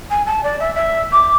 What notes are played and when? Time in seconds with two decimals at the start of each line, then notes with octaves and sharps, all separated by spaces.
0.10 G#5
0.26 A5
0.43 D5
0.60 E5
0.75 E5
1.12 D6